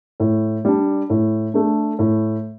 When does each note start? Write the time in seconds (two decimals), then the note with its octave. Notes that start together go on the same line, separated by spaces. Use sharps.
0.20 A2
0.65 G3 D4
1.10 A2
1.54 A3 D4
1.99 A2